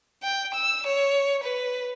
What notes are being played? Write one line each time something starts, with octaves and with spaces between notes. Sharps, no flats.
G5
E6
C#5
B4